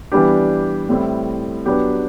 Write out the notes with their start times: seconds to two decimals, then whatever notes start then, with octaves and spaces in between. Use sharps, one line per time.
0.12 E3 G3 B3 D4 G4
0.89 A2 G3 C4 E4
1.66 F#3 B3 D4 G4